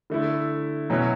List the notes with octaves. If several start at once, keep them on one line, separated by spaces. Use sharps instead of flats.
D3 A3 E4
B2 F#3 C#4 E4